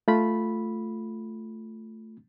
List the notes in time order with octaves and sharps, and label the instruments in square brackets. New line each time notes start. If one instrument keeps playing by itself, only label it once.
[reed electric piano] A3 F4 B5